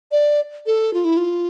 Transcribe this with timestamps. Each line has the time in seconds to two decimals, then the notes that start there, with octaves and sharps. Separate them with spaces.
0.12 D5
0.66 A4
0.94 F4
1.05 E4
1.17 F4